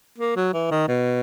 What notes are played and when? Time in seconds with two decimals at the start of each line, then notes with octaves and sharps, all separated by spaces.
0.18 A#3
0.36 F#3
0.53 E3
0.71 D#3
0.88 B2